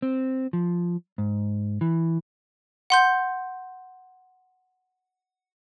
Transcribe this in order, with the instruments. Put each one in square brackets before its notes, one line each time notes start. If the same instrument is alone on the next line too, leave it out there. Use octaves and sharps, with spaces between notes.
[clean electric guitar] C4
F3
G#2
E3
[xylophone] F#5 C6 G6